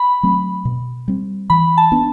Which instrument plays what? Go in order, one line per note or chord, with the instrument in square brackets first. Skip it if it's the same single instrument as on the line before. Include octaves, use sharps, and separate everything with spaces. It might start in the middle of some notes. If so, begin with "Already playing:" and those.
Already playing: [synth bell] B5
[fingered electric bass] F#3 A3 C4
B2
G3 C4
[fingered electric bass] E3 [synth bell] B5
[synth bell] A5
[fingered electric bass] B3 D4